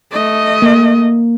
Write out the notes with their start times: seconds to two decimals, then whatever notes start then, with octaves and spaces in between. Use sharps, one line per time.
0.13 A3 D#5
0.62 A#3